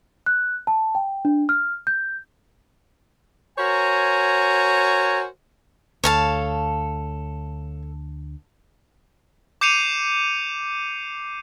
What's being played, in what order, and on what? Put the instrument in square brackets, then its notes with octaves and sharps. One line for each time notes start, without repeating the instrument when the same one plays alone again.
[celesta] F#6
A5
G5
D4
F6
G6
[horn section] F#4 A#4 C5 C#5 G#5 A#5
[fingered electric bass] D2 [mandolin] A4 [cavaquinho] C#5 F5 A5
[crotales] D6 G6 C7 C#7 D#7 F7